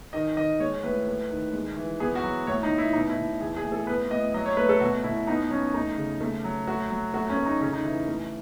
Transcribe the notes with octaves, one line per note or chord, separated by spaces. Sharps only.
D#3 D#5
D#3 D#5
G#3 C#5
A2 B4
A3
D#3
G#3
E3
B3 G#4
F#4
F#3
A2 C#5
D#4
A2
E4
B2 D#4
E4
B2
E3 G#4
G#4
A2
A4
B3 B4
A2 D#5
F#3 D#5
C#5
A3 B4
A4
B2 F#4
B2 E4
B3 D#4
F#3 C#4
A3 D#4
C#3
A3
F#3
A3 F#4
F#3
A3 F#4
C#4
A3
D#4
C#3 C#4
D#4
E3 E4
A3